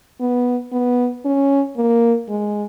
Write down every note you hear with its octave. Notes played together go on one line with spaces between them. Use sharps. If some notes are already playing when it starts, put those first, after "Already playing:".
B3
B3
C#4
A#3
G#3